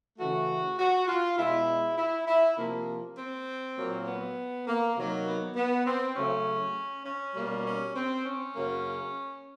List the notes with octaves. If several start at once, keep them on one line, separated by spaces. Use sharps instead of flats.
C#3 E3 A3 F#4
F#4
F4
B2 G#3 E4
E4
E4
C3 F3 A#3
C4
A#2 F#3 A#3
B3
A#3
C3 D#3 F#3 A#3
B3
B3
C4
C#3 F#3 A3 C#4
C#4
B2 G3 A#3
C#4
C4
C#4
F#2 C#3 F#3 A#3